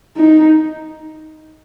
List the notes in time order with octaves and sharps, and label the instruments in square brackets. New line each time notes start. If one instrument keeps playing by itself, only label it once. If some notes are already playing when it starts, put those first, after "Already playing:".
[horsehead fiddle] D#4